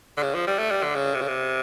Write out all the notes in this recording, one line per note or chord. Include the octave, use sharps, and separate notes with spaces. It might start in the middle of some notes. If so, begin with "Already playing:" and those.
D3
C#3
F3
G3
A3
G3
D3
C#3
C3
C#3
C3